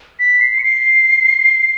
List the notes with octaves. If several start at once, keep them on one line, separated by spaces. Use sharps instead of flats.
B6
C7
C#7
C7